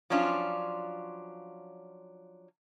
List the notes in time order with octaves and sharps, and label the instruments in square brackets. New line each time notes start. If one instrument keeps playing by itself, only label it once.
[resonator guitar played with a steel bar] F3 F#3 C#4 D4 F4